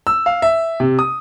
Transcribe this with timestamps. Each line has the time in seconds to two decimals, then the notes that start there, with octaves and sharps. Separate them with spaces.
0.07 E6
0.26 F5
0.42 E5
0.80 C3
0.99 D#6